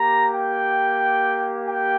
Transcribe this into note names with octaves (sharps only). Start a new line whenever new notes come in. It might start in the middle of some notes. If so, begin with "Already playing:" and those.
Already playing: A#3 G4 A#5
G5
G5